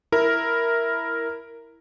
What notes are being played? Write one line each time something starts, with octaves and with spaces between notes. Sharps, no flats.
E4 A#4